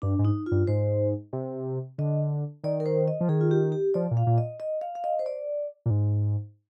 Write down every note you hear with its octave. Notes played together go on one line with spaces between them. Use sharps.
G2 D4
G#2
D#4
F4
G2
G#2 C5
C3
D3 D#5
D#3 D5
A#4
C5
D#5
F3
D#3 G#4
F4
G4
G4
F3 D5
A#2
F5
A#2
D#5
D#5
F5
F5
D#5
C5
D5
A#2
G#2